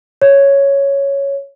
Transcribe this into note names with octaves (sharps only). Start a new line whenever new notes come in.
C#5